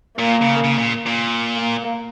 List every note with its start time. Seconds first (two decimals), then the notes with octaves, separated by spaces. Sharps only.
0.18 A#2 A#3
0.42 C#3
0.64 C#3
0.78 A#2
1.06 A#2
1.57 A#3